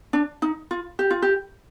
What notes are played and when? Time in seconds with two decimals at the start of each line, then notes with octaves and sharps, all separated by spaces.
0.13 D4
0.42 D#4
0.71 F4
0.99 G4
1.11 F4
1.22 G4